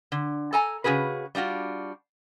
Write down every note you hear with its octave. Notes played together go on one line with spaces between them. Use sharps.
D3
A4 G#5 A#5
C#3 G3 F#4 G#4 B4
G3 D4 F4 F#4